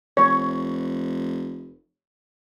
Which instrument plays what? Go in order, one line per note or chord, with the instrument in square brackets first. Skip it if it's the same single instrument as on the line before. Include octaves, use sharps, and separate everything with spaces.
[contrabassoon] F1 [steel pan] C#5